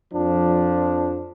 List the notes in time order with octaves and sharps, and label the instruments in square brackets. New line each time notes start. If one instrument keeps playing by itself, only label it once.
[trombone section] F2 F3 D4